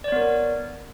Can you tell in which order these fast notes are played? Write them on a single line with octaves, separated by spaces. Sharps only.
D5 C#5 B3 A#4